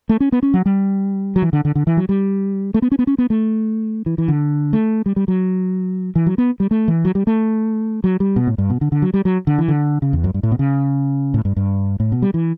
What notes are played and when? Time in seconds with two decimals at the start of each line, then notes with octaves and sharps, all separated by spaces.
0.09 A3
0.20 C#4
0.32 B3
0.43 C#4
0.54 F#3
0.66 G3
1.36 F#3
1.42 E3
1.53 D3
1.65 D3
1.75 D3
1.87 E3
1.97 F#3
2.09 G3
2.74 A3
2.82 B3
2.92 C#4
2.99 B3
3.07 C#4
3.18 B3
3.30 A3
4.06 E3
4.18 E3
4.28 D3
4.73 A3
5.06 G3
5.16 G3
5.28 F#3
6.15 E3
6.27 F#3
6.38 B3
6.60 G3
6.71 A3
6.88 E3
7.05 F#3
7.15 G3
7.27 A3
8.04 F#3
8.20 G3
8.36 B2
8.47 A2
8.58 G2
8.70 B2
8.81 D3
8.92 D3
9.02 F#3
9.14 G3
9.25 F#3
9.47 D3
9.58 E3
9.68 D3
10.02 C#3
10.13 E2
10.24 F#2
10.34 G2
10.43 A2
10.52 B2
10.59 C#3
11.34 A2
11.45 G2
11.56 G2
12.00 A2
12.12 B2
12.22 G3
12.34 E3